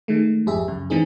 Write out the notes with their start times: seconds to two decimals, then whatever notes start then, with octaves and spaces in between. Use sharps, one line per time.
0.08 D#3 G#3 A3
0.46 G#1 F2 G4 G#4 E5
0.68 C#2 F#2 C#3
0.90 G#1 E3 G#3 C4 D#4 G#4